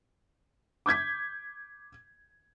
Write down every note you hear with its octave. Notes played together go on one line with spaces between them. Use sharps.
D6 G6 G#6 B6